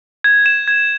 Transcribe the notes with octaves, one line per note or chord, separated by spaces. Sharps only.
G#6
E7
G#6